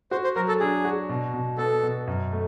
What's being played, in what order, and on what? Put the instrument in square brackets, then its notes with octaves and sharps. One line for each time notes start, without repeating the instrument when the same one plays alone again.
[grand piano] F#4 [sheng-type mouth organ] C5
[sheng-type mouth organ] C5
[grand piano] F#3 [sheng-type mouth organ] A#4
[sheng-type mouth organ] A4
[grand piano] D4 [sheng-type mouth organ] G#4
[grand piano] F#4
B2
B2
[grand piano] B3 [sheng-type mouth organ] A4
[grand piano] B2
F#2
A3